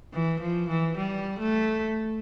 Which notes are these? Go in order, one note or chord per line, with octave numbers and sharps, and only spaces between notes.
E3
F3
E3
G3
A3